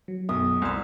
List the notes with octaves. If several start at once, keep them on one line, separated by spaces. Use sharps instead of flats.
F#3
B1 F#2 D#6
C2 C4 G#5 C6 E6